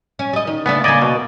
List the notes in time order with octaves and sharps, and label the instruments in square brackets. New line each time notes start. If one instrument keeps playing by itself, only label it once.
[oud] C#4
G3 D#5
D#3
[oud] C#3 A3 D4 [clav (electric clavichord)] B3
[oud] C#3 A#3 [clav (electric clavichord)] D5 D#5 G#5
[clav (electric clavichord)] B2